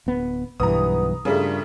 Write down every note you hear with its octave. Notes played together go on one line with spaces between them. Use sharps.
D1 B3
B1 G2 E3 B3 A#5 D#6
G2 A#2 C#3 G3 A3